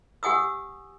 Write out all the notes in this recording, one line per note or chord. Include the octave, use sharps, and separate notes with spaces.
G4 F#5 G#5 D#6 E6